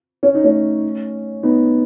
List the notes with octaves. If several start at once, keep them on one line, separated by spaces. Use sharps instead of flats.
C#4
D#4
A3 C#4
B3 D#4